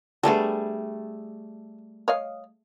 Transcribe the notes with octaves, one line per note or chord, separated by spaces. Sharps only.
D3 G3 A3 B3 G#4 A4
C#5 D#5 F5